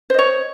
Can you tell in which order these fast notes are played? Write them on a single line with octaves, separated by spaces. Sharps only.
C5 D#5 C#5